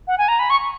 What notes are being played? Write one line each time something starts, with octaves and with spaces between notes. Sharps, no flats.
F#5
G#5
A#5
B5
C#6